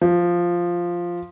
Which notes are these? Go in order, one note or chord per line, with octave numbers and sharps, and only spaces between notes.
F3